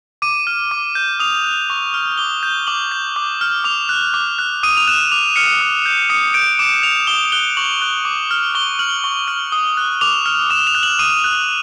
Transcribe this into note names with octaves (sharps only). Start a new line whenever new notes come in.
D6 D#7
F6
D6
G6
D#6 F7
F#6
C#6
F6
D6 G7
G6
D6 F#7
G6
D6
F6
D6 F7
F#6
D6
F#6
D#6 D#7
F7
F#6 E7
D6 F7
F6 C#7
D#6
G6
D#6 C#7
G6 D7
D6 E7
G6 F7
D#6 G7
F#6 G7
C#6 F#7
F#6
D6
F6
C#6 G7
F6 F#7
C#6
F6
D#6
F#6
D6 F7
F6
D6 E7
F7
F#6
F#7
D#6 D#7
F#6